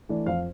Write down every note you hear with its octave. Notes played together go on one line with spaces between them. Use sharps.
E3 A3 D4
F2 F5